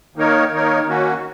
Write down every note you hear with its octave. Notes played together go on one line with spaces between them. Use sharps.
D#3 A#3 D#4 A#4 C#5
D#3 A#3 D#4 A#4 C#5
D#3 A#3 C#4 F#4